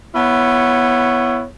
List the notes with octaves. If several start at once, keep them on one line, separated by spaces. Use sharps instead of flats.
B3 E4 C#5